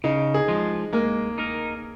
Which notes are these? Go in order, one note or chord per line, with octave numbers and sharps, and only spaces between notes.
C#3 D#4
G#4
F3 G#3
G#3 A#3
D#4 A#4